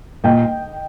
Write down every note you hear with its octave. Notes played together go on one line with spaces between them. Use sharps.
A#2 D#5 G5